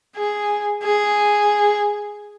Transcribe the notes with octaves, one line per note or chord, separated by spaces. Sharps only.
G#4
G#4